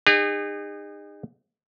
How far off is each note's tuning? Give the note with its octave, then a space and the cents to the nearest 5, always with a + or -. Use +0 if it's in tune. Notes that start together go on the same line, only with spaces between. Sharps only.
D#4 -30 G#4 -40